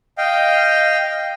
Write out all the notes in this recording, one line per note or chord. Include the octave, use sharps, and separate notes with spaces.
D#5 F5 G5